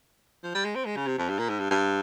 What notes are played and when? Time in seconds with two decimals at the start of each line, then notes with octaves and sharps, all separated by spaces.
0.43 F3
0.54 G3
0.64 G#3
0.75 C4
0.85 G#3
0.96 C#3
1.07 C3
1.18 F2
1.29 G2
1.39 A#2
1.49 G#2
1.59 G2
1.71 G2